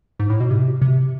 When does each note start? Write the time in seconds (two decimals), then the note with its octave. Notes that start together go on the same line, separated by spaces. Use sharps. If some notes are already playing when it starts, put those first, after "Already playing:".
0.19 G#2
0.30 A2
0.40 B2
0.51 C3
0.81 C3